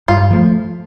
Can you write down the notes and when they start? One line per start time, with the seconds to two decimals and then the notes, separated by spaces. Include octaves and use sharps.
0.08 G2 F4
0.31 F3 A3